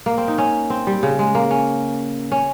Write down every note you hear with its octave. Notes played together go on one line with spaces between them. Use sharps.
A#3
C4
D#4
C#4
C4
G3
C#3
G#3
A#3
C#4
C#4